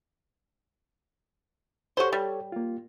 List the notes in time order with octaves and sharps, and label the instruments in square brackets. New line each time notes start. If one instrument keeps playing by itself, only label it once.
[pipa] F#4 C5 [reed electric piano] G4 A4 C#5
[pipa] G3
[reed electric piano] A#3 F4